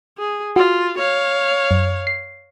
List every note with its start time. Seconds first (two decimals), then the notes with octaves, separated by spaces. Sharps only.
0.18 G#4
0.56 F4 F#4
0.98 C#5 F5
1.71 F#2
2.07 C7